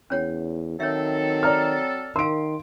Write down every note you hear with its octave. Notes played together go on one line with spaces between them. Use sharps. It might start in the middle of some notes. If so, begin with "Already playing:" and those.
E2 C#4 C#5 F#5
D#3 F#3 C4 A4 C#5 E5
D5 A#5 F6
D#3 A#4 F5 C6 D7